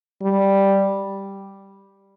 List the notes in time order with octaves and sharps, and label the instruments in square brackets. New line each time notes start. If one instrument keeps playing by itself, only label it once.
[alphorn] G3